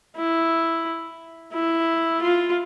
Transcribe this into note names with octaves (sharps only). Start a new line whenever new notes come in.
E4
E4
F4